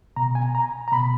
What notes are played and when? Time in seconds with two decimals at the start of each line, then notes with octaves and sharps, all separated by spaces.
0.16 B2 A#5
0.35 G#5
0.55 A#5
0.88 A#5
0.92 B2 B5